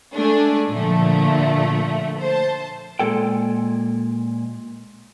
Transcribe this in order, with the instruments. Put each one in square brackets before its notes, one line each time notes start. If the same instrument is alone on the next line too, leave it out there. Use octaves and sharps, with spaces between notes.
[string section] G#3 A3 D4 G#5
A#2 D3 F3 A3
C5 A5
[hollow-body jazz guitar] A#2 G#3 A4 G5